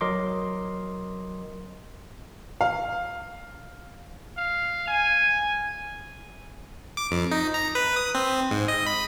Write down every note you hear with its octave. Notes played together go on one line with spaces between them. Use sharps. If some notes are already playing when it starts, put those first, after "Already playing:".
F#3 A#4 D#5 C6 D6
F5
F5
G#5
D6
F2
D#4
A#5
B4
D#6
C4
G#2
D#5
B5